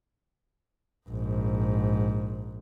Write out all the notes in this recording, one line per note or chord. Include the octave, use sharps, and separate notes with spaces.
A#1 G#2